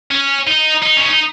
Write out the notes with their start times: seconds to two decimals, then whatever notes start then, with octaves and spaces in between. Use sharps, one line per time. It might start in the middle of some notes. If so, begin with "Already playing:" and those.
0.11 C#4
0.47 D#4
0.83 D#4
0.97 C#4
1.08 D#4